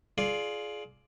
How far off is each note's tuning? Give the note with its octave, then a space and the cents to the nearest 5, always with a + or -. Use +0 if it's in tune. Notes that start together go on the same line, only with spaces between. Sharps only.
F4 +0 G#4 +30 D5 +0